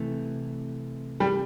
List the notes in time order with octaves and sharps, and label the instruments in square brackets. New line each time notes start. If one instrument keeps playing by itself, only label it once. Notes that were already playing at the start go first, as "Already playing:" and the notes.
Already playing: [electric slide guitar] C3 E3 A3
[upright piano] G3